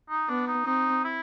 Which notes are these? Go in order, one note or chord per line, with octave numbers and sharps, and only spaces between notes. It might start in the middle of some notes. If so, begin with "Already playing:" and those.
D#4
B3 D4
D#4
C4 D#4
E4